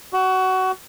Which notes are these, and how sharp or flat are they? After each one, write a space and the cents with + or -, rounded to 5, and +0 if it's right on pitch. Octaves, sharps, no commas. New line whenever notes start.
F#4 +20